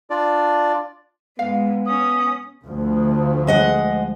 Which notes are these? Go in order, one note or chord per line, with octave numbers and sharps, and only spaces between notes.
D4 F4 D5
G#2 G#3 B3 F5
C#4 D#6
D2 F3
G#3 D#5 F#5